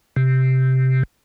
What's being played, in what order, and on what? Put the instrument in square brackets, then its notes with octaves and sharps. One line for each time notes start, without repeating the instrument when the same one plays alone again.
[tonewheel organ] C3